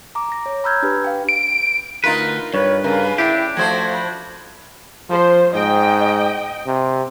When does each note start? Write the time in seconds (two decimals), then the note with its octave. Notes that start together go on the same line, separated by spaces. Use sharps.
0.15 A#5 D6
0.32 A#6
0.46 C#5
0.64 A#5 B5 E6 F6 G6 G#6
0.82 D4 G4 B4
1.04 F5 G5
1.29 D7
2.04 D2 D#4 F4 A#4 B4
2.54 G2 B4 C#5
2.84 C#3 A#4
3.18 D4 E4 G4 G5
3.57 F3 A3 F#4 C5 G#6
3.93 B5
5.10 F3 C5
5.53 G#2 D#5 G5
6.66 C3